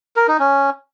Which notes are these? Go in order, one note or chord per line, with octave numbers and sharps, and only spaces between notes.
A#4
D#4
C#4